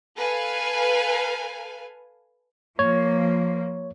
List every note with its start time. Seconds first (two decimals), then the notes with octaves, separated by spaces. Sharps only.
0.16 A4 B4 F5 G#5
2.79 F3 A#3 C#5